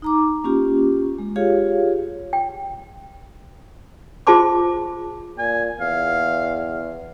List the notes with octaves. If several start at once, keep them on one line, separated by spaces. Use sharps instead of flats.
D#4 A#5 D6
A#3 C#4 F4 G4
G#3
F4 G4 G#4 C#5 F5
G5
F4 G#4 C5 A5 C6 D6
A#2 G#5
E2 F5